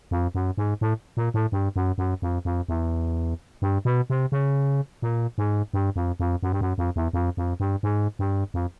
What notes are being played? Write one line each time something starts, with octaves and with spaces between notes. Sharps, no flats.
F2
F#2
G#2
A2
A#2
A2
G2
F#2
F#2
F2
F2
E2
G2
B2
C3
C#3
A#2
G#2
G2
F2
F2
F#2
G2
F#2
F2
E2
F2
F2
G2
G#2
G2
F2